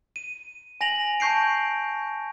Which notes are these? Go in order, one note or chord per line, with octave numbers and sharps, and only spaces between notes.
D#7
G#5 A#6 F7 F#7
A5 C#6 G6 C7 D7